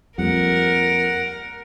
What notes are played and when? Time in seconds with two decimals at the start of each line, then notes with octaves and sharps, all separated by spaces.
0.18 F2 G3 A#3 A#4 F#5